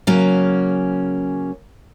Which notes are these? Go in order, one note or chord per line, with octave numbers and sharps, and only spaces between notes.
C#3 F#3 A#3 C#4